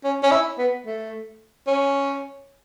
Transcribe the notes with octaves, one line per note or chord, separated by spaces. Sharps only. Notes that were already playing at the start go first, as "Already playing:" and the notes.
C#4
C#4
E4
B3
A3
C#4